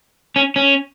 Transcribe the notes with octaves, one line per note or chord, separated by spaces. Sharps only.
C#4
C#4